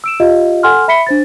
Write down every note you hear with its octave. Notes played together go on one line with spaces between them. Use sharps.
E6 D7 E7
F4 G4 D#5 F5
A4 F#5 G#5 C6 F6
E5 B5 B6 C#7 G7
D4 C5 A6